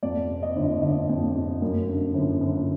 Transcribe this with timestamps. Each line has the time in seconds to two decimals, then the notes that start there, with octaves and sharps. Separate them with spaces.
0.03 F2 D5
0.29 C3
0.43 D#5
0.56 G1
0.82 G1 D#5
1.09 F2
1.35 C3
1.62 F#2
1.88 D3
2.14 G1
2.41 G1